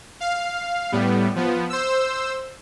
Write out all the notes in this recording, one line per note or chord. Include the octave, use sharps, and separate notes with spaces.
F5
A2 G3 B3
F3 B3
C5 E6